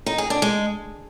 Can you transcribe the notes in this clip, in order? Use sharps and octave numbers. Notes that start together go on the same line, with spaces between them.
D#4
G#4
D4
G#3